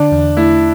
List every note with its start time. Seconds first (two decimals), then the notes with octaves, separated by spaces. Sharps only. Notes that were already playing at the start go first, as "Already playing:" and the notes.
Already playing: D3 D4
0.12 E2
0.37 A3 E4